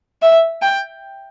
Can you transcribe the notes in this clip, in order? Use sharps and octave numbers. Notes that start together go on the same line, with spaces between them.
E5
G5